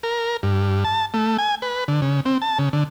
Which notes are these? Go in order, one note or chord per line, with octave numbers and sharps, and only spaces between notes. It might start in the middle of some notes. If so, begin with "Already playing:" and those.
A#4
G2
A5
A3
G#5
B4
D3
C#3
C4
A5
C#3
D3